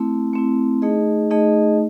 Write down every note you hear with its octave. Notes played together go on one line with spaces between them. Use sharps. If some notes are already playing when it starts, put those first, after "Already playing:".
Already playing: A3 C4 E4
A3 C4 E4
A3 D#4 G#4 D#5
A3 D#4 G#4 D#5